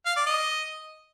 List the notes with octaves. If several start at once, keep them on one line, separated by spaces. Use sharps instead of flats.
F5
D5
D#5